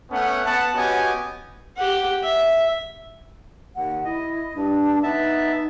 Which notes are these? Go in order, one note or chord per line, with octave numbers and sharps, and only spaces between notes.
A3 B3 C#4 F#5
B3 F#5 A5
B3 C#4 F#4 G4 D#5 G#5
G4 F#5
E5
D#2 F#5
E4 D#5
G2 D4
B3 D#4 E5 A5